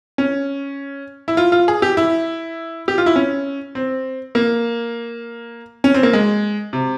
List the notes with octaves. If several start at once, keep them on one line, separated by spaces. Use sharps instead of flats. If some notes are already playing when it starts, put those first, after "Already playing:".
C#4
E4
F4
F4
G#4
G4
E4
G4
F4
E4
C#4
C4
A#3
C#4
C4
A#3
G#3
C3